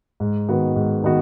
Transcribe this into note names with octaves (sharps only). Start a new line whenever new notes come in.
G#2
D#3 B3 F#4 B4
G#2
D#3 B3 F#4